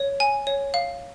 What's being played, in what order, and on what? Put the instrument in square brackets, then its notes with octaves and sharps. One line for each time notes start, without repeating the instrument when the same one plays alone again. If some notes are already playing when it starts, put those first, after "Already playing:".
Already playing: [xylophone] C#5
G#5
C#5
F5